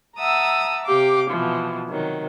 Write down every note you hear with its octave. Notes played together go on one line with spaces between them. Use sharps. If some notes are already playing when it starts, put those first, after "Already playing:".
E5 F#5 A5 A#5 D#6 E6
C3 G4 F5 D6
B2 E3 F3
C3 D#3 F#3